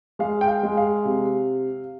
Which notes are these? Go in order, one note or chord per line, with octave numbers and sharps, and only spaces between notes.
G#3 F5
G5
F5
G#3
F5
C3